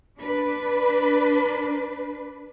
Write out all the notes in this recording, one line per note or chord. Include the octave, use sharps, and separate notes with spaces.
D4 B4